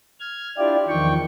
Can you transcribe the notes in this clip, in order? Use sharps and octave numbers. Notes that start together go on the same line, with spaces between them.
F6 G#6
D4 E4 F4 G4 D5
E2 D#3 F3 G5 C#6